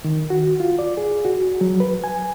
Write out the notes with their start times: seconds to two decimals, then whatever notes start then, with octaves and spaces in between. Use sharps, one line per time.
0.05 D#3
0.30 F#4
0.60 F4
0.79 D5
0.97 G#4
1.25 F#4
1.61 F#3
1.80 B4
2.04 G#5